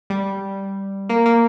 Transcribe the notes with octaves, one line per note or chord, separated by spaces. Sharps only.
G3
A#3
A#3